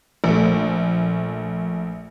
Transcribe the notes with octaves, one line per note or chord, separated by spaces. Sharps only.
A#1 A3